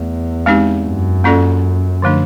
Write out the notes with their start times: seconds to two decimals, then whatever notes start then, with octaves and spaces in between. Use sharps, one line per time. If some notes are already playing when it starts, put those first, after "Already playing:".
Already playing: E2 A3
0.46 G#3 C4 D#4 G4
0.85 F#2
1.24 A#3 C#4 F4 A4 D5
2.02 D3 F3 A3 D4